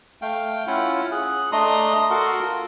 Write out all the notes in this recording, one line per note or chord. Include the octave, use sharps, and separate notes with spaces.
A3 F5 G5
C#4 E4 F4 F#5
G#4 F#6
A3 D4 D#5 A#5 C6 D#6
F#4 A4 A#4 F#5 C6
F4